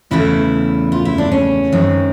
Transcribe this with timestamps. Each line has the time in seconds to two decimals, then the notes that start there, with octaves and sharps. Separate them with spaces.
0.11 E2 C#3 E3 A3 E4
0.92 F4
1.05 E4
1.18 D4
1.32 C#4
1.72 F#2 D#3 G#3 C4